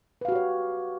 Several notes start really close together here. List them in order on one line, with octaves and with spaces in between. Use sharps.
B4 F5 F#4 G4 C#5